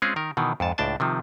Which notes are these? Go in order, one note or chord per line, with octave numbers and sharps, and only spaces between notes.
G#3 C4 C#4 F4 G#4
D#3 A#4
B2 D#3 E3
F2 G#2 A5
C#2 A2 D4 G5 A5
C3 D#3 F3